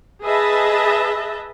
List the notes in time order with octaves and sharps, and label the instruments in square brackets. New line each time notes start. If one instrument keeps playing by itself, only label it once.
[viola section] G#4 B4 D#5 E5 A5